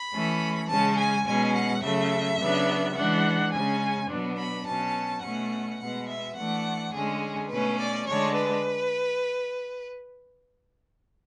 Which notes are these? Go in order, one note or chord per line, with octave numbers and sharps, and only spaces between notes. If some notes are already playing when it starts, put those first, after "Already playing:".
Already playing: B5
E3 A3 C#4
C#3 G#3 C#4 A5
G#5
B2 G#3 C#4 G#5
F#5
C#3 F#3 A3 E5
C#3 F#3 B3 D4
E3 G#3 D4 F#5
C#3 G#3 C#4 G#5
B2 F#3 B3 D4
B5
B2 F#3 C#4 A5
B2 A3 C#4 F#5
B2 G#3 B3 F#5
E5
E3 A3 D4 F#5
D3 G#3 C#4 G#4
B2 A3 C#4 B4
D5
D3 G#3 D4 C#5
B4